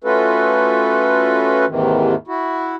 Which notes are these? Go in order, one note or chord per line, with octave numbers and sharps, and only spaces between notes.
A3 C#4 F4 F#4 A4 B4
D#2 G#2 C3 D#3 E3
E4 F#4